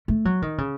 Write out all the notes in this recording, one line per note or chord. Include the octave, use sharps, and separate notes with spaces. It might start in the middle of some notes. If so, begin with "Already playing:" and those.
A3
F#3
D#3
C#3